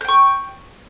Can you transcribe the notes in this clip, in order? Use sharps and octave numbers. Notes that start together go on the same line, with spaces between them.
G5 C#6 G6